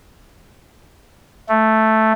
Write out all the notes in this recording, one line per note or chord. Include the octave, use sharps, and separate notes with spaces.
A3